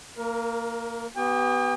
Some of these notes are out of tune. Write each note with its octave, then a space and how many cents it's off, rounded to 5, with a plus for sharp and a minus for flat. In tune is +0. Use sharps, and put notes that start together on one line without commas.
A#3 -15 A#4 +20
B3 +0 G4 -35 G5 +45